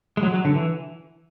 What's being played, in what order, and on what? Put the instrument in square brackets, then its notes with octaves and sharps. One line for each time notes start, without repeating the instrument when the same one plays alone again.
[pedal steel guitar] G#3
F#3
F#3
D3
E3